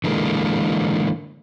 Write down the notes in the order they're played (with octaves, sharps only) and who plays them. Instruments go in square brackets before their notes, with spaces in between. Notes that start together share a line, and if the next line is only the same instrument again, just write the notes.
[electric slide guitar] D3 E3 G#3 A#3